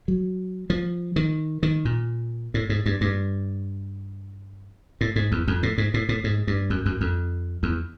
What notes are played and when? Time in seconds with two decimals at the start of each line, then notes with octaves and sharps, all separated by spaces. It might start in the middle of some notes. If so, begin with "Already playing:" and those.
0.08 F#3
0.70 F3
1.16 D#3
1.63 D#3
1.85 A#2
2.54 A2
2.69 G#2
2.86 G2
3.01 G2
5.01 A2
5.16 G#2
5.32 E2
5.48 F2
5.63 A2
5.78 G#2
5.94 A2
6.09 A2
6.24 G#2
6.47 G2
6.70 F#2
6.86 F#2
7.01 F2
7.63 E2